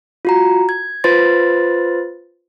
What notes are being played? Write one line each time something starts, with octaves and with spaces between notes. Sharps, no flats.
F4 F#4 A#5
G#6
F4 B4 C5 C6 A6